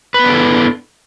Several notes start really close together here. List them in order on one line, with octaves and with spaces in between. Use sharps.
B4 B3 D4 A4 E4